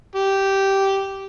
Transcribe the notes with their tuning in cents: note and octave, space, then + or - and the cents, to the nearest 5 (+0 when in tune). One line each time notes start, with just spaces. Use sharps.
G4 -10